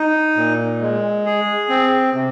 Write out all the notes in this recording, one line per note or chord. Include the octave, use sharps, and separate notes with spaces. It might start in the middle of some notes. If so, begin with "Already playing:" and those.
Already playing: D#4
A#2
G#3
G#4
C4
C3